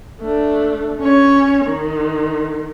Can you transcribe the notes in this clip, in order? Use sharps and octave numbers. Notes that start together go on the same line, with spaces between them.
A3 D4
C#4 C#5
D#3